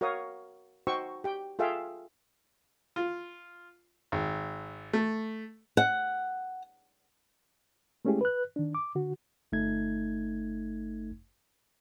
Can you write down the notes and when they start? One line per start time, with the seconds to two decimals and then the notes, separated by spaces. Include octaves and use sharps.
0.01 F#4 A#4 C#5 F5 D#6
0.87 D#4 F#4 C5 G5 C#6 E6
1.24 G4 G5
1.59 F4 G#4 A4 E5 F5 G5
2.96 F4
4.12 G#1
4.93 A3
5.77 F#5
8.05 G#3 A3 C#4 E4 G4 G#4
8.21 B4 F#6
8.56 D#3 D4
8.75 D6
8.95 D3 F#4
9.52 G1 A3 D#4 G#6